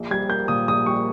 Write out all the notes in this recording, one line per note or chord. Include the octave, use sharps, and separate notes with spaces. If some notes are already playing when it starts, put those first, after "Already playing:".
Already playing: A#1
G3 G#6
A#3 G6
A#2 D#6
A#1 D#6
G3 C#6